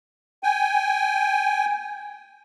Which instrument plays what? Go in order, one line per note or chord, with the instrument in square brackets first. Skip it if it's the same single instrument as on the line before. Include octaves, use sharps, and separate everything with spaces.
[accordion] G5 G#5